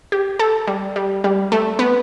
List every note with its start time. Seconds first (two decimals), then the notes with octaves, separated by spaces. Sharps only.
0.12 G4
0.39 A4
0.67 G3
0.96 G3
1.24 G3
1.52 A3
1.79 B3